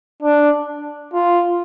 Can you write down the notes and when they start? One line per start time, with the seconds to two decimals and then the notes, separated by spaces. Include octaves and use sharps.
0.22 D4
1.13 F4